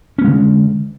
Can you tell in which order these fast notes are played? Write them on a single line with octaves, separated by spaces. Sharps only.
C#4 B3 G#3 D3